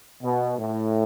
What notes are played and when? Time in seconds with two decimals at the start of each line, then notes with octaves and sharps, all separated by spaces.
0.22 B2
0.57 A2